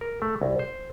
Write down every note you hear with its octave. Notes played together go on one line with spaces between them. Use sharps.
A#4
A3
C2
C5